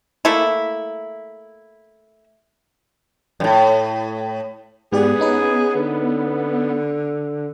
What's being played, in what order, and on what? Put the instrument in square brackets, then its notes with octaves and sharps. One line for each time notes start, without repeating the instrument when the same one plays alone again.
[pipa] A3 A#3 E4
[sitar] F#2 A2
[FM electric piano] G#2 G4 D5 [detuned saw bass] B3 [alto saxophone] G#4
[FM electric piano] C#4 D#4 B4
[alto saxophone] D3